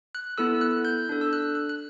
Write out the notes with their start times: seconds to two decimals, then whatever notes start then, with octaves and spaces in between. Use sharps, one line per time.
0.15 F#6
0.38 B3 E4 A4 E6
0.61 F#6
0.85 G6
1.09 D4 A4
1.21 E6
1.33 F#6
1.55 F#6
1.69 F#6